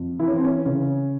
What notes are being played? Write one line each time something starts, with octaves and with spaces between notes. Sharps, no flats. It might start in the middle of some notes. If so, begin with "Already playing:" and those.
Already playing: F2
E3 E4
C#4
C4
C#4
C#3 C#4